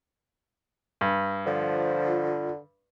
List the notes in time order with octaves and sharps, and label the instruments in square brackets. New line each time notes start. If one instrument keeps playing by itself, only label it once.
[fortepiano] G2
[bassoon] D3 [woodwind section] F3 [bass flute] F4